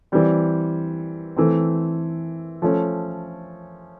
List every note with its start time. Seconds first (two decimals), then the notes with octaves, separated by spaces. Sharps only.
0.12 E3 G3 C4
1.36 E3 A3 C4
2.62 F3 A3 C#4